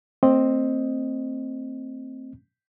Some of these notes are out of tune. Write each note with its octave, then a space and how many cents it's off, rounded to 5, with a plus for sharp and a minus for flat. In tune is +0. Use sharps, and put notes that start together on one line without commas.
A3 +45 C4 +10 D#5 -5